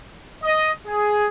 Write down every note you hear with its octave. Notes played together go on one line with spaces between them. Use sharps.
D#5
G#4